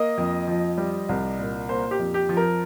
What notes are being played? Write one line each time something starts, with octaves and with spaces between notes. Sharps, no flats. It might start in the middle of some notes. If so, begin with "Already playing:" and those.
Already playing: A#3 D#5
F2
F3
G3
C2
A#2
A#3 C5
G4
F2
G4
F3
A#4